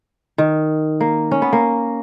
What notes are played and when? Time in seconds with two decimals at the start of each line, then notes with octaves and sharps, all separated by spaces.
0.38 D#3
1.01 A#3
1.31 C#4
1.42 B3
1.53 A#3